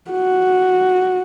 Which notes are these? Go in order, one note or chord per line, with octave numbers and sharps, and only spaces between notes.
F#4